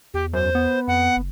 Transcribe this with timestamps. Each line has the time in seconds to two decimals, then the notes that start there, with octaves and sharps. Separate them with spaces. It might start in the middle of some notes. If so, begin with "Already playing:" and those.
0.14 E2 G4
0.33 F#2 C5
0.55 B3
0.88 F2 F#5
1.17 F#1